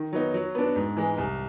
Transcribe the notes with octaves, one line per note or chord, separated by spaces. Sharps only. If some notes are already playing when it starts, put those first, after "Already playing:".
Already playing: D#3
F#3 B3 D#4
F#3
B3 D4
G#2
E3 G#3
C2